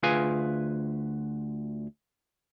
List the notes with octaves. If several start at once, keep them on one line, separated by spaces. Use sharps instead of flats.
D2 F4 G#4 B4 F5 G#5